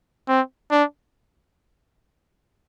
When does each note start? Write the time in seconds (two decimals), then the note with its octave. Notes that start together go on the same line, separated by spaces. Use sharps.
0.28 C4
0.71 D4